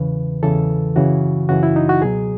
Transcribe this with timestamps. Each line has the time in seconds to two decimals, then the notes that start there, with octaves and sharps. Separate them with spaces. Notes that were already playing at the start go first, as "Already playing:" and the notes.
Already playing: E2 C#3 E3 B4
0.43 E2 C#3 E3 A4
0.96 F#2 C#3 E3 F#4
1.49 F#2 C#3 E3 F#4
1.63 E4
1.76 D#4
1.89 F#4
2.02 C#2 B2 F#3 G#4